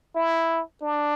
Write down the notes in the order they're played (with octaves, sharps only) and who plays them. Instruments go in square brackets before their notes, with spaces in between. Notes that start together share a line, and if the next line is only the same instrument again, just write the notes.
[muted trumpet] E4
D4